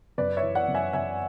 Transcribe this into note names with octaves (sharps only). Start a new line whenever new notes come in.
F#2 B4 D5
C#5 E5
E3
D5 F#5
F#2
E5 G#5
F#2 E5 G#5